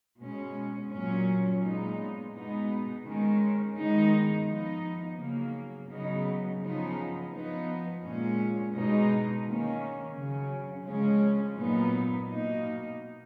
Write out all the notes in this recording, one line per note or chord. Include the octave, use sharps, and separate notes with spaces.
B2 G#3 C#4
A#2 F#3 C#4
A#2 G#3 B3 D#4
B2 G#3 B3 D#4
D#3 G#3 C#4
D#3 G#3 B3 D#4
F3 B3 D#4
C#3 F#3 A#3
C#3 F#3 B3 D#4
C#3 F3 B3 D#4
F3 B3 D#4
A#2 G#3 C#4
B2 G#3 D#4
D#3 A#3 C#4
C#3 F#3 C#4
C#3 F3 G#3 C#4
A#2 F#3 B3 D#4
B2 A#3 D#4